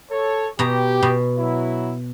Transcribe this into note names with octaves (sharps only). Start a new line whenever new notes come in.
A4 C#5
B2 G4 A#5
B2
F#3 E4